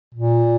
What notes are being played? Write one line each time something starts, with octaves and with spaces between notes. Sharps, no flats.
A#2